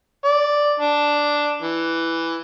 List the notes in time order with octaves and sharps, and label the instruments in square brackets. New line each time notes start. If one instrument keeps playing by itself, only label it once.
[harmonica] D5
D4
E3